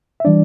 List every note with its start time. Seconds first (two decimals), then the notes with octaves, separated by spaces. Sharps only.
0.20 E5
0.25 E3 G3 D4 D5